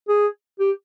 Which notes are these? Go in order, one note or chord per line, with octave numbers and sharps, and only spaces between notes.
G#4
G4